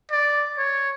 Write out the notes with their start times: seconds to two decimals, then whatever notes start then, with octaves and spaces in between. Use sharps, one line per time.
0.12 D5
0.58 C#5